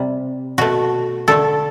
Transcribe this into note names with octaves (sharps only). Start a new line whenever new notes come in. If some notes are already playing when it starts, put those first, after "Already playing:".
Already playing: C3 G3
B2 A3 F#4
D3 A3 A4